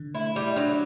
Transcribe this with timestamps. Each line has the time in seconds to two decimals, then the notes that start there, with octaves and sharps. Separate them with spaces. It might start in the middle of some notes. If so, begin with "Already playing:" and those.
Already playing: D3
0.14 A3 E4
0.35 G3 G4
0.56 F#3 D4